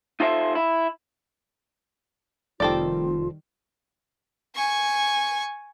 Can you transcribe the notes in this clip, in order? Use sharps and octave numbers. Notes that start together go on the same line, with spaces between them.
D#4 F4 A4 C5 D#5 E5
E4
F1 D#3 G3 C4 F4 A4 D5
G#5 C#6